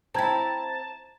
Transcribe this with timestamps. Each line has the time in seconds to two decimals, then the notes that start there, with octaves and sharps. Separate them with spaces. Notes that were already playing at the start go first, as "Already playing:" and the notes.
0.15 C4 E4 A5 A#5 G#6